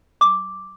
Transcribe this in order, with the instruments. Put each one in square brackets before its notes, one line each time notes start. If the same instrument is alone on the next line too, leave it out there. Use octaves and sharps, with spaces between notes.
[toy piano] D6